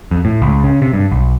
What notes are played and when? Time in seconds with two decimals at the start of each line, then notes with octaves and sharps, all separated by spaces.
0.11 F2
0.25 A2
0.42 C#2
0.64 C#3
0.82 C3
0.93 G2
1.12 B1